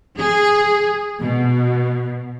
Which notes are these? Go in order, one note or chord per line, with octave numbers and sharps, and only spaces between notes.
G#4
B2